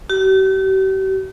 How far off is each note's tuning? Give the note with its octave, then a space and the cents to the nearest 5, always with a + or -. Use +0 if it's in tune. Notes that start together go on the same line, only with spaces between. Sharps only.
G4 -40